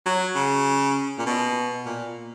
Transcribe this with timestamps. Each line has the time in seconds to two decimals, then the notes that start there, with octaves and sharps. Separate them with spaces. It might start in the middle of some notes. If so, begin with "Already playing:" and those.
0.06 F#3
0.35 C#3
1.18 A#2
1.26 B2
1.86 A#2